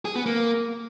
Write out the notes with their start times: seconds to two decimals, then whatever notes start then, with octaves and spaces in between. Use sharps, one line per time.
0.05 G#4
0.15 B3
0.26 A#3